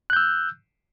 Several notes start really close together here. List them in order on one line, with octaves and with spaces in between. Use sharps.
F#6 G6 E6